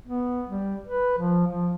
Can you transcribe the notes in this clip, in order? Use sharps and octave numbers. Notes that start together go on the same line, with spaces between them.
B3
G3
B4
F3
F3